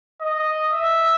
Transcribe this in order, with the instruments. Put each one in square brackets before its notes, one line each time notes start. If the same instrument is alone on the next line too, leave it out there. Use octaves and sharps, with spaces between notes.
[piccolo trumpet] D#5
E5